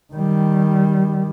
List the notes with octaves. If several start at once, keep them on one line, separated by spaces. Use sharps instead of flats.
D#3 G3